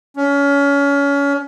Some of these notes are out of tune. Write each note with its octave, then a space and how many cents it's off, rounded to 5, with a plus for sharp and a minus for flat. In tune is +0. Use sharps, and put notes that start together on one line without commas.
C#4 +30